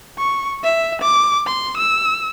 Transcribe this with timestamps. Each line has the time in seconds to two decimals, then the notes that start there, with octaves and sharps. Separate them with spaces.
0.19 C#6
0.64 E5
1.02 D6
1.47 C6
1.77 E6